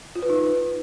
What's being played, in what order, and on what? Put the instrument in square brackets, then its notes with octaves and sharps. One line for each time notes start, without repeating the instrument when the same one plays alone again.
[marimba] F4
B4
D#4